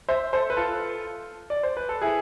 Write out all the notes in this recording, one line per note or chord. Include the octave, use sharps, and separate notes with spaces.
C5 E5
A4 C5
B4
F4 A4
D5
C5
B4
A4
E4 G#4